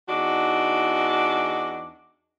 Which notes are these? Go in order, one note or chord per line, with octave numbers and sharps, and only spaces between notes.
E2 D4 D#4 F#4